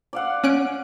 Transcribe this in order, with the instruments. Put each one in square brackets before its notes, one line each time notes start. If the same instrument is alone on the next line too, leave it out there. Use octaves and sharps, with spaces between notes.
[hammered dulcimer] D5 F5 F#5
[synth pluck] C#4 F#6 D7